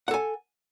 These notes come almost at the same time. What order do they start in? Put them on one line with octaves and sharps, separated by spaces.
F#5 A4 G#5